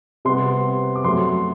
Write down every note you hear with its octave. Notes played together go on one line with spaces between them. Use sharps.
C3 G3 B3 C6
D6
F#2 F#3 A3 C6